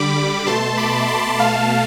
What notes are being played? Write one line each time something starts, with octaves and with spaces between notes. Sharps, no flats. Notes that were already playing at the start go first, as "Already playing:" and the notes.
Already playing: D3 G3 B5 D6
B2 A3 A5 C6
B5 D6
A5 C6
B2 A3 F5 A5